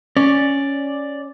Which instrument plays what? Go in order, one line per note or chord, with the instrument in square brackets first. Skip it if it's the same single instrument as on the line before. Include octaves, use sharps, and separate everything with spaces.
[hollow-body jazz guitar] C#4 [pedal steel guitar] D5